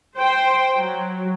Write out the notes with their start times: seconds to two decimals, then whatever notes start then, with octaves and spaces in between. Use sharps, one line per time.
0.17 C5 G5
0.76 F#3